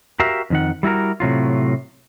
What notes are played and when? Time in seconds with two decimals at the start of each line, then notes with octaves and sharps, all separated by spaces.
0.20 F#4 G4 A#4 E5 F5
0.50 F2 D#3 F#5
0.83 G3 E4 F#4 A#4
1.20 A2 C3 F#3 F4